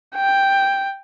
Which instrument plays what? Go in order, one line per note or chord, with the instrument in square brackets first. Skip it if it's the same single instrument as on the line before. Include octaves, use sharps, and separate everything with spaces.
[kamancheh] G5